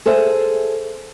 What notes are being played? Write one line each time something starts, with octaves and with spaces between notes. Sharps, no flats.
G#4 A4 C5 E5